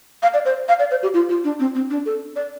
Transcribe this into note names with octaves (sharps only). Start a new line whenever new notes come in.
F5
D5
C5
F5
D5
C5
G4
F4
F4
D4
C4
C4
D4
A4
D5